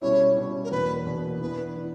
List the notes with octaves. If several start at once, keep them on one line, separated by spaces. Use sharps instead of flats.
B2 G3 C#4 E4 C#5
B2 G3 C#4 E4
A#4
E2 B2 A#3 D4 B4
E2 B2 A#3 D4
E3 B3 D4 B4
E3 B3 D4